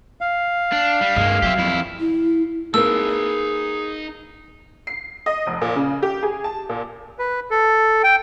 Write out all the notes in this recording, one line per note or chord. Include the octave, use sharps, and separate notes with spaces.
F5
D4
G3
G2 G#3 A#3
F#3 G4 E5
F2 E4
E4
A#3 D#4 G#4 B4 A5 E6
C7
D#5
F1
A#2
C#3
G4
G#4
A5
A#2
B4
A4
G5